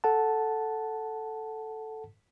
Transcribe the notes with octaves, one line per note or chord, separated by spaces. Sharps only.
A4 F#5 A5